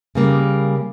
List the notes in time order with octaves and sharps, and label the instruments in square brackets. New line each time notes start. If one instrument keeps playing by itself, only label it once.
[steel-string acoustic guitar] C#3 G3 A#3